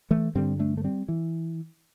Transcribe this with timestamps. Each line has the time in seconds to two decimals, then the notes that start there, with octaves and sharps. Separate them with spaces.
0.10 E3 A3
0.35 G2 D3 G3 C4
0.59 A3 D4
0.77 A3
0.84 G3 C4
1.08 E3